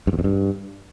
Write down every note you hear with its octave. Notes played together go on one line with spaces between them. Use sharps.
G2
E2
F2
G2